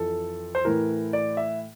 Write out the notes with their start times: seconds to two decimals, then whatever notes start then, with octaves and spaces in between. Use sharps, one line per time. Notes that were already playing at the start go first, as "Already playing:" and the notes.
Already playing: F2 E3 A4
0.55 C5
0.65 A2 E3 A#4
1.13 D5
1.37 E5